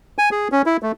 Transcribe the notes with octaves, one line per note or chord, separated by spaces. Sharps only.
G#5
G#4
C#4
E4
A3